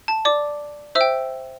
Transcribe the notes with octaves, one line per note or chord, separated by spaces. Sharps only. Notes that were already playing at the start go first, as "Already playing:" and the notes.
A5
D5 D6
C5 E5 E6
G5